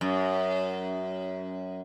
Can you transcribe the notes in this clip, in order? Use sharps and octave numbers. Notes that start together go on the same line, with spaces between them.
F#2